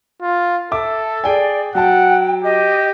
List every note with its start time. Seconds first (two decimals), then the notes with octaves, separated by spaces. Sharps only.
0.22 F4
0.72 A4 E5 D6
1.24 G#4 D5 G5 G#5
1.75 F#3 F#5 G5 A5
2.44 G4 D#5